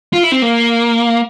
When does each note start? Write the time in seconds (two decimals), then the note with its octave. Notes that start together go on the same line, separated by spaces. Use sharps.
0.13 F4
0.23 E4
0.32 C4
0.42 A#3